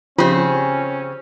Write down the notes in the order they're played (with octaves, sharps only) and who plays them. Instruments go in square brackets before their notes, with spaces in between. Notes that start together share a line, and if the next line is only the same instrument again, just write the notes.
[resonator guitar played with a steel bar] C#3 C4 [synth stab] F3 [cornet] C#4 [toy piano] F4 G4 C#5